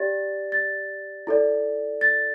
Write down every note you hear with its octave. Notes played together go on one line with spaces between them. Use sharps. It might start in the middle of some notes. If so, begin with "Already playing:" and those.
Already playing: G4 D5 A6
A6
E4 A4 D5
A6